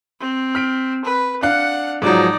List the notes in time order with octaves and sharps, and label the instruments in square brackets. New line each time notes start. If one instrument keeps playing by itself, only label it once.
[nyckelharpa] C4
[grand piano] F6 B6 D7
[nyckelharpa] B4
[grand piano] D4 F5 F#6 [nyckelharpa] F#5
[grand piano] G#2 F3 F#3 [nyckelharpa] D#4 D5